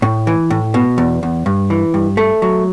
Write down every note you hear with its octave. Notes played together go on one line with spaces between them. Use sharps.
A2
E3
A2
B2
E2
E2
G2
E3
G2
A3
F#3